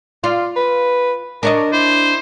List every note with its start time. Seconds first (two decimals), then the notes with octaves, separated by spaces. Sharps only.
0.24 F4 D5
0.56 B4
1.43 D4 A#4 C#5 D#5
1.73 E4 C5